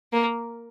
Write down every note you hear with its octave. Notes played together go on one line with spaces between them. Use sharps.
A#3